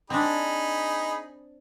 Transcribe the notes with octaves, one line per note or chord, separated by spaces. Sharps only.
C4 D4 D#4 G#4 B5